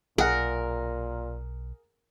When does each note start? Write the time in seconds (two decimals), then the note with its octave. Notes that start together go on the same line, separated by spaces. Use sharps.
0.18 B1 A#2 G#4 A#4 F#5